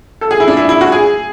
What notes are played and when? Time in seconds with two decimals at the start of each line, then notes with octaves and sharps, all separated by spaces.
0.21 A4
0.31 G#4
0.40 E4
0.48 D4
0.57 E4
0.69 E4
0.81 F#4
0.92 G#4